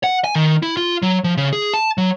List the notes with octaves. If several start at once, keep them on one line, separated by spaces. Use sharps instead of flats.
F#5
G#5
D#3
E4
F4
F#3
F3
C#3
G#4
A5
F#3